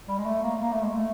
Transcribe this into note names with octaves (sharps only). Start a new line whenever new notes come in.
G3
G#3
A3
A#3
A#3
A3
G#3
A3